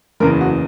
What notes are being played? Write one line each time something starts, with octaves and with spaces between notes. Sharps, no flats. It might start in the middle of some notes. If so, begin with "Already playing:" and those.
F#1 E2 C#3 A#4
F#4